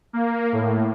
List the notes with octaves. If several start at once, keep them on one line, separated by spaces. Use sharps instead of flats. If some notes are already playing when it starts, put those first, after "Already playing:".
A#3
A2